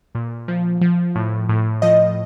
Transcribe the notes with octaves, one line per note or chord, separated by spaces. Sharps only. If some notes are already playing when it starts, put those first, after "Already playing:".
A#2
F3
F3
A2
A2
F3 D#5